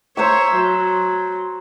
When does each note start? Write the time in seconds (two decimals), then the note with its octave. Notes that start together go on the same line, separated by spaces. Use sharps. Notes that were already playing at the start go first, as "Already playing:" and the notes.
0.17 C5 C#5 E5 A#5 C#6
0.55 F#3